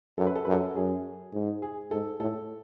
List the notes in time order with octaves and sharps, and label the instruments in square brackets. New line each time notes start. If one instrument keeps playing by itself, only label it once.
[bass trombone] F#2 [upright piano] A4
[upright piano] B4
A4
[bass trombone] F#2 [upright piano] B4
[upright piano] A4
[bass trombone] F#2 [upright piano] G#4
[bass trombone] G#2
[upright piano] G#4
[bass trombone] G#2 [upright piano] A4
[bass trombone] A2 [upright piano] A4